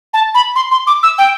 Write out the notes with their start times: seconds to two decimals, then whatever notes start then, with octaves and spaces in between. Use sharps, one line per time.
0.14 A5
0.35 B5
0.56 C6
0.71 C6
0.87 D6
1.03 E6
1.18 G5